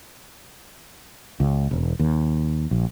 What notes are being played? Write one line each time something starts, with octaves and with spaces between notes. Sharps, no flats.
C#2
E1
D#2
A#1